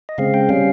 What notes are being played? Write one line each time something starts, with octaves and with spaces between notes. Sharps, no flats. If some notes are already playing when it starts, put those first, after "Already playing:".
D#5
C#3 G#3 C4 F5
G5
G3 C#4 F5